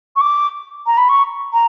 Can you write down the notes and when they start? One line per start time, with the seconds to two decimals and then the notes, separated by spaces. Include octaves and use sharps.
0.15 C#6
0.20 D6
0.86 A#5
0.97 B5
1.09 C#6
1.53 A#5